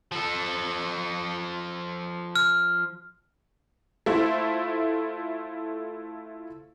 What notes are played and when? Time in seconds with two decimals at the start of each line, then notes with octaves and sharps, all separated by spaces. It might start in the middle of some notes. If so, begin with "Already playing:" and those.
0.12 F3 A4
2.36 F6
4.06 A3 E4 F4 C5 E5